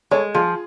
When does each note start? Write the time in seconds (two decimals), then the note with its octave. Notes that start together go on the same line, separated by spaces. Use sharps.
0.11 G#3 A4 C#5
0.35 F3 F4 G#4